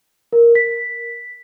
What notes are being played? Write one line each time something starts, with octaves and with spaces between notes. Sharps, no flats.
A#4
B6